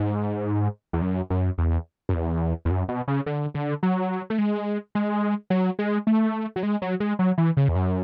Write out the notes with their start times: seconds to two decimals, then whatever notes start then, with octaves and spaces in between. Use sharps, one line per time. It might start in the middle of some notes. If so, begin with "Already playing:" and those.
Already playing: G#2
0.93 E2
1.02 F#2
1.30 F#2
1.58 E2
2.09 F#2
2.14 E2
2.65 E2
2.70 F#2
2.89 B2
3.08 C#3
3.26 D3
3.55 D3
3.83 F#3
4.30 A3
4.38 G#3
4.95 G#3
5.50 F#3
5.79 G#3
6.07 A3
6.56 F#3
6.63 G#3
6.82 F#3
7.00 G#3
7.19 F#3
7.38 E3
7.57 C#3
7.68 E2
7.75 F#2